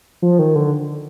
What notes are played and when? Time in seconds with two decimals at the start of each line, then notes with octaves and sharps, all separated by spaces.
0.22 F3
0.39 D#3
0.55 D3